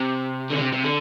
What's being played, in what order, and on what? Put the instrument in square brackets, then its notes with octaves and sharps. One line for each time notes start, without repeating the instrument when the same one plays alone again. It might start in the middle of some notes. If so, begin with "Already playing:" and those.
Already playing: [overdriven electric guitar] C3
D3
C3
C3
D3